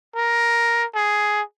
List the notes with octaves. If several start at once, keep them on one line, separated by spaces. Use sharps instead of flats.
A#4
G#4